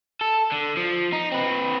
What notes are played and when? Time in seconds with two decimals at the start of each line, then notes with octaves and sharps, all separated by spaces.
0.21 A4
0.52 D3
0.77 F3
1.13 D#4
1.32 C4 B4